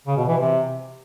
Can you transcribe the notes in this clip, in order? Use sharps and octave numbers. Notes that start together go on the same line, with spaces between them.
C#3
B2
E3
C3